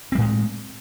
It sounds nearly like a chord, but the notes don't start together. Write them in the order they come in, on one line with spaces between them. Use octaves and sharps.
C4 G3 A2 G#3